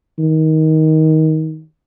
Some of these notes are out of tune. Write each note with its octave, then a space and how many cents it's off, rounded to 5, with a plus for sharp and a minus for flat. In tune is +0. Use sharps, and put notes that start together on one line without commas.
D#3 +20